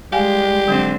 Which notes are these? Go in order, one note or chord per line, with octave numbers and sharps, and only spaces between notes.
G3 G#3 G4 F5 G#5
D3 F#3 G#3 C4